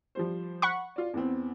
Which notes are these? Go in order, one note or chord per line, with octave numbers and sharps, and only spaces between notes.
F3 G3 C5
F#5 B5 C#6
F4 D5
E2 B3 C4